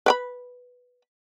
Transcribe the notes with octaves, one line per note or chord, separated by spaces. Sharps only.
B4 G5 B5